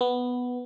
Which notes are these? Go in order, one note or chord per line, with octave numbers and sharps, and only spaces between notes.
B3